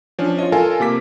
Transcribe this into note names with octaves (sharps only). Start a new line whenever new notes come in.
F3 C#4 D4
F4 C#5 D#5
F4 A4 A#4 F5 G#5
C3 A#3 D6 B6